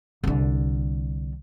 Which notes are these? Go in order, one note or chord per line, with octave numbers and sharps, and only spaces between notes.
C2 D3